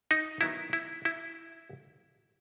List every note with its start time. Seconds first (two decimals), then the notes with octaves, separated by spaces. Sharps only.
0.11 D#4
0.41 D#3 F#3 B3 D#4 E4
0.73 E4
1.05 E4